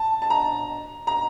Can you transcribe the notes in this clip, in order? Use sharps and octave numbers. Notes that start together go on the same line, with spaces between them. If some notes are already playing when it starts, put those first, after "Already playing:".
Already playing: A5
A5
A#5
A#5